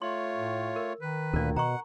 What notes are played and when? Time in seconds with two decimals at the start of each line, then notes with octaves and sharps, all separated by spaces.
0.02 A3 F4 C#5 C6
0.33 A2
0.76 A#4
1.01 D#3 B4
1.33 D2 A#2 A#4 D5
1.57 B2 F#5 A#5 C#6